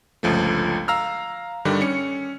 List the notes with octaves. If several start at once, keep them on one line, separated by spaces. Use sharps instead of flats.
G1 C#2 F3 A3
F5 A#5 E6 F6
G2 D3 D#3 G3 D4
C#4 C#7